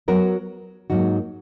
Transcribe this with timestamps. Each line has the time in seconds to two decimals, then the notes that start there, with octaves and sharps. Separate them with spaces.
0.08 F#3 B3 F#4 A#4
0.90 G#2 F#3 A#3 D#4 F#4